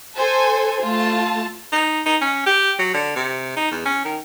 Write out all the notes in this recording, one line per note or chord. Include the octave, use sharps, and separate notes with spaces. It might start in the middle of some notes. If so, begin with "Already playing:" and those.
A4 C5 G#5
A3 F4 A5
D#4
D#4
C#4
G4
F#3
D3
C3
D#4
E2
C#4
D#3